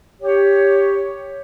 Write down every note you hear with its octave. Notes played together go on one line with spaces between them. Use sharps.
G4 C#5